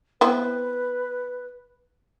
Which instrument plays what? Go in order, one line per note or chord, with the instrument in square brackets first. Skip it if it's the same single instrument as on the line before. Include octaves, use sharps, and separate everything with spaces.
[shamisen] B3 C4 E4 [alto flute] B4